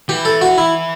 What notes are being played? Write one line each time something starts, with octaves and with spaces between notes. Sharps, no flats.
E3 G4
A4
F#4
E4